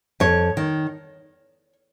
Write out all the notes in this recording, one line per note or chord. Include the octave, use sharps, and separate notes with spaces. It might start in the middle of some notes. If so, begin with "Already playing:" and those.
F2 C#5
D#3